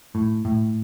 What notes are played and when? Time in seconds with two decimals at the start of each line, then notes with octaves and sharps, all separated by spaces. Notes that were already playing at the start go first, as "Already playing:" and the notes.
0.15 A2
0.45 A2